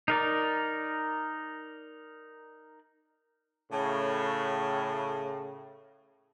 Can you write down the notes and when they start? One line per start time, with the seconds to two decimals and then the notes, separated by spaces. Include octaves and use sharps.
0.08 D#4 A#4 D5
3.71 A2 C#3